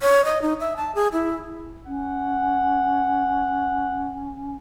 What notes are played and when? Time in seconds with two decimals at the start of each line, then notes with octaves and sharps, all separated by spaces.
0.01 C#5
0.25 D#5
0.42 D#4
0.60 E5
0.77 A5
0.95 G#4
1.13 E4
1.87 C#4 F#5